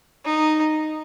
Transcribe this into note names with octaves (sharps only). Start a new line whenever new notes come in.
D#4